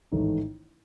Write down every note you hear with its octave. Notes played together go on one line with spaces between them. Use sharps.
A1 G#2 D#3 A3 D#4